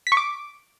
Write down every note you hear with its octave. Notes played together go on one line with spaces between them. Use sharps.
B6
C#6
D6